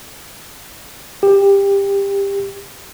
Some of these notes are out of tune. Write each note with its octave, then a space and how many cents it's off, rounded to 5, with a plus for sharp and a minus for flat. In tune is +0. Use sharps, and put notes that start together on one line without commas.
G4 +20